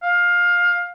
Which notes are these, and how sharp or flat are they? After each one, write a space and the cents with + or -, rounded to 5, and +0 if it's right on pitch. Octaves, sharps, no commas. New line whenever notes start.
F5 +20